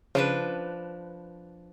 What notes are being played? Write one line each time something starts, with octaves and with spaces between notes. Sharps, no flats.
C#3 F3 D4 B4